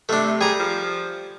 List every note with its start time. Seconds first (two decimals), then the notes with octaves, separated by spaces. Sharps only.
0.09 C3 A3 D4
0.41 G3 G#4 A#5
0.60 F3